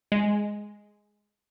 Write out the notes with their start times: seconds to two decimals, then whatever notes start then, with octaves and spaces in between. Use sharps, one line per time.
0.12 G#3